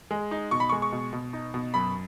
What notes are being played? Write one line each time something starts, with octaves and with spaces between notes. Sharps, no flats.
G#3
D#4
B2 C#6
B5
C#6
G#3
C#6
B2
B2
D#4
B2
F#2 B5